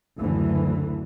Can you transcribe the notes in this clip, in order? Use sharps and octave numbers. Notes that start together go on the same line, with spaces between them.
F#1 D2 D3 E3